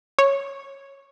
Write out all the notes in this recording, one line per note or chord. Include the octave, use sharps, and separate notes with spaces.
C#5